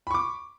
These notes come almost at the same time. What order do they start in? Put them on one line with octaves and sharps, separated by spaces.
B5 C#6 D6